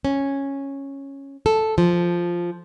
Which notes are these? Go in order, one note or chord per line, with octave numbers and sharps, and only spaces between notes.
C#4
A4
F3